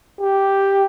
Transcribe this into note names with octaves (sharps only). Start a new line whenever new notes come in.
G4